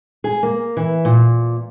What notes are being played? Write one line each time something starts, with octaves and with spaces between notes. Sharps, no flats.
G#4
A#3
E3
A#2